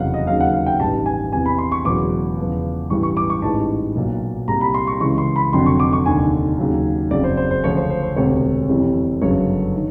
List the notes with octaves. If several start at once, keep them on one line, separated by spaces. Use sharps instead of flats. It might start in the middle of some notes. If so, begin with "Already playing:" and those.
Already playing: F1 E2 C#3 F#3 F5 F#5
D#5
D#2 C#3 F#3 F5
F#5
F5
G5
A1 G2 D#3 G3 A5
G#5
E2 C3 E3 G#5
B5
C6
C#6
E1 E2 C#3 F#3 D6
E2 C#3 F3
A1 G2 E3 G3 C#6
C#6
D6
C#6
A1 G#2 E3 G3 A5
B1 A#2 F#3
C2 A#2 G3 A#5
B5
C6
C#6
C#2 C#3 E3 C#6
C6
B5
F1 F2 D3 F#3 C6
C#6
D6
C#6
F1 D#2 D3 G#5
D#2 C#3 F#3
F#1 F2 C#3 F#3 D5
C5
C5
C5
D2 C#3 F3 C#5
C5
C5
C5
E1 D2 C3 C#5
F2 C3 E3 G3
G1 F#2 C#3 F#3 C#5
D#3